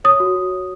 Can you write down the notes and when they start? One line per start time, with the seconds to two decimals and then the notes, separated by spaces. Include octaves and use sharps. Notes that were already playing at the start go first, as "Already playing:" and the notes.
0.04 C#5 D#6
0.20 F#4
0.36 F#4
0.51 C#5